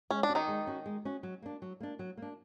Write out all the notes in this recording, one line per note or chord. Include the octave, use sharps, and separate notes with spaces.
G#3 C#4
D4
C#4 F#4
D#3 D#4
G#3
C#4 F#4
G#3
C#4 F#4
F#3
A#3 D4
F#3
A#3 D4
F#3
A#3 D4